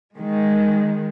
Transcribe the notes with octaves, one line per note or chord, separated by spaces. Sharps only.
D#3 G#3